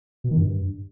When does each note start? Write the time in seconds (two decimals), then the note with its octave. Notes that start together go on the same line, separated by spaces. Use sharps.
0.24 B2
0.31 D#3
0.37 G2